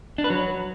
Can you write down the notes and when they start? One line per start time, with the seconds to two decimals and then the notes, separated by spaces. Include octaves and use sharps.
0.18 D4
0.24 B4
0.30 F#3